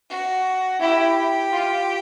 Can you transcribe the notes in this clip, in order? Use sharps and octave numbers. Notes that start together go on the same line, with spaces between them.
F#4
E4 G4
F4